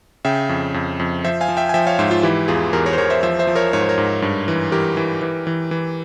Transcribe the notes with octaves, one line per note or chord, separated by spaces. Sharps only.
C#3 E5 G5
F2
F2
F2
F3 C5 E5
F5 G#5
F3
E5 G5
G#5
F3 E5 G5
C#5 F5
G#2 C5 E5
F4
E3 E4 G4
E2 F4 G#4
E2 G4 A#4
A#4 C#5
C5
E2 A#4 C#5
C5 E5
F3 C5 E5
C5 E5
F3
A#4 C#5
G#2 C#5
C5
A#4 C#5
G#2
G2
E3
E3 G4 A#4
E3
E3
E3
E3